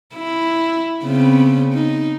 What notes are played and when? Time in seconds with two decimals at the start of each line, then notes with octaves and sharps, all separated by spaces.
0.15 E4
1.04 C#3 B3 C4
1.74 D#4